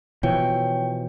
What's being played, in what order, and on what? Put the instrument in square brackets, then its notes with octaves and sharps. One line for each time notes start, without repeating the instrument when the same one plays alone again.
[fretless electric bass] B2 E3 F3 [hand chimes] C#5 G5